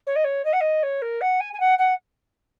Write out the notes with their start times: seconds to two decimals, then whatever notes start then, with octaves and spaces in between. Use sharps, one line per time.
0.07 C#5
0.16 D#5
0.24 C#5
0.45 D#5
0.53 F#5
0.61 D#5
0.83 C#5
1.02 A#4
1.21 F#5
1.40 G#5
1.53 G#5
1.60 F#5
1.78 F#5